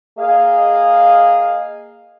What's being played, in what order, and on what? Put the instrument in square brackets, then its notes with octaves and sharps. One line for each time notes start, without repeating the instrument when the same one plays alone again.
[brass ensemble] A#3 G#4 D#5 F5